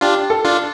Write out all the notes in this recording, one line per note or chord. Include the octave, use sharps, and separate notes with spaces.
D4 F4 G4
A4
D4 F4